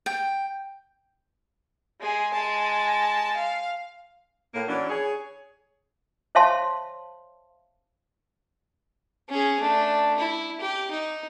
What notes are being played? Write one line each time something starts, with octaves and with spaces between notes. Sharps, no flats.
G5
G#3 G#4
G#3 A5
F5
A2 A#3
E3 F#3 C#4 D4
G#4 C#5
C5 C#5 E5 F5 A5 C6
C#4 G#4
A3 D4
E4
G4
D#4